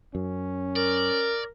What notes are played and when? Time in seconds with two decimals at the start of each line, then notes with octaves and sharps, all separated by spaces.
0.15 F#2 C#4
0.76 A#4 D5